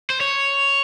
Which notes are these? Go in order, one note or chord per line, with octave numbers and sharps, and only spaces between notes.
C5
C#5